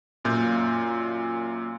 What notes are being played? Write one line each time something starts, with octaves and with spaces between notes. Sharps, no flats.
F#2 A#2 F4 G6